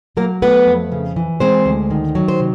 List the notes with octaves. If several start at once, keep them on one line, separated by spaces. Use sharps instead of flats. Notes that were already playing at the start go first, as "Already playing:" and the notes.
F#3 A#3 A#4
A3 B3 B4
F2
C#3
E3
G#3 C4 C5
D2
D#3
F#3
C5
C3